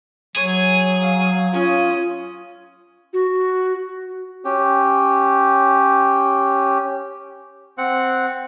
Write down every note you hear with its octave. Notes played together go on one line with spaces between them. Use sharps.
F#3 G#4 C#5
F5
C#4 F4 D#6
F#4
C#4 G4
C4 F#5